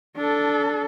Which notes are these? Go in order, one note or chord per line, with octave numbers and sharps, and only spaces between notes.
D4 A4